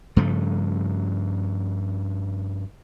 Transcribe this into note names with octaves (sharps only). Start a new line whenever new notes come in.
G2 C#3 F3 A3